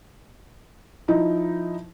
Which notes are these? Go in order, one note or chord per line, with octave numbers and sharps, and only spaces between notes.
F3 D#4 E4